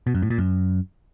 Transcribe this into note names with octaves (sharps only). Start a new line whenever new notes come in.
B2
F#2
A2
A#2
F#2